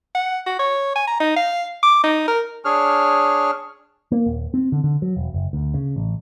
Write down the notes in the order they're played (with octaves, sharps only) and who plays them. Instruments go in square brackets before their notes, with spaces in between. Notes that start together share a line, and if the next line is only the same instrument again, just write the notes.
[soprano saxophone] F#5
F#4
C#5
G#5
A#5
D#4
F5
D6
D#4
A#4
[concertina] D4 G#4 C#5 F6
[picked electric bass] A#3
D#1
C4
D3
D3
F#3
E1
F#1
D2
C#3
A1